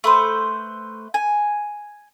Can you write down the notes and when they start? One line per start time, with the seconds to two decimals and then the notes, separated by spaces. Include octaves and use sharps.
0.04 A3 B4 C5
1.14 G#5